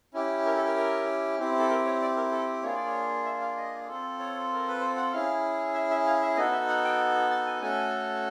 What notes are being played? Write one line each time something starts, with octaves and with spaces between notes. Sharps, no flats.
C#4 E4 G4
A#4
A4
A#4
A#4
C4 E4 G4
A4
A#4
C#5
D5
A#4
A4
A#3 D4 F4 G#4 C#5
D5
C#5
E5
F5
D#5
C4 F4 A4
C#5
A#4
B4
C5
F#5
C#4 E4 G#4 F5
E5
E5
F5
E5
B3 D#4 F#4 A4 D#5
E5
F#5
G5
A5
G#5
A3 C#4 F#4 A4 G#5